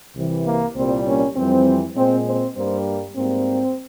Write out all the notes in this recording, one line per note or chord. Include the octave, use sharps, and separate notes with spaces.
C2 C3 E3
A#3
C2 A#2 G3 A#3 C4
A#3 C#4
F2 E3 G3 C4
A#2 G#3 C4
C4
G2 G3 A#3 C4
G#2 G3 A#3 C4